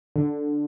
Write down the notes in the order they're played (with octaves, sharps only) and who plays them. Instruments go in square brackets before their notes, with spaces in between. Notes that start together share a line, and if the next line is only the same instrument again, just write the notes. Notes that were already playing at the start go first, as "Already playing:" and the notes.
[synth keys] D3